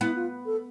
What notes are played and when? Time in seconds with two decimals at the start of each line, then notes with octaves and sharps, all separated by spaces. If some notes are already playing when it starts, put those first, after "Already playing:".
0.01 B3 E4
0.16 F4
0.46 A4